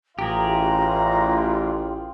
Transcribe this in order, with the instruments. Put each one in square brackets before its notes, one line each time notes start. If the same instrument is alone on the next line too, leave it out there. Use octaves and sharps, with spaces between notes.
[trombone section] A1 [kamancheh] F4 [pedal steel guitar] G4 G#4 [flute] A#5